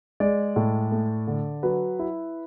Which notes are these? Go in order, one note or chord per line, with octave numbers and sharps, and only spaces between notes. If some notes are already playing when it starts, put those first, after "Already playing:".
G#3 D5
A2
A3
D3
F#3 B4
E4